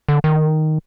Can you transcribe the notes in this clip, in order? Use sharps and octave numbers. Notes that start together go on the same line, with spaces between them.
D3
D#3